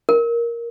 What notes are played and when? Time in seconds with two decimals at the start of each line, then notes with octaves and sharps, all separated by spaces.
0.09 A#4